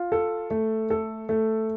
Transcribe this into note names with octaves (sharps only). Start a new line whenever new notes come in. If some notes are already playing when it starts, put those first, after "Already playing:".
Already playing: F4
A4
A3
A4
A3